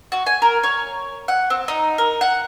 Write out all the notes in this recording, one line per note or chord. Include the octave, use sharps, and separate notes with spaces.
F#4
G#5
A#4
C#5
F#5
C4
D#4
A#4
F#5